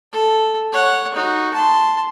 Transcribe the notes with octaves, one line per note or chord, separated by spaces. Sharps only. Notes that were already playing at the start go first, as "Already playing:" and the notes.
A4
C#5 F#5
D#4 F#4
A5 C6